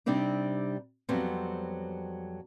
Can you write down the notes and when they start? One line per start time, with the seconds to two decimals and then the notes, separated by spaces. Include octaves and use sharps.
0.06 C3 G3 C4 D4 D#4
1.09 F2 F#3 G3 B3 C4